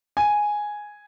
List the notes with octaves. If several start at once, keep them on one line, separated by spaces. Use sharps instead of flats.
G#5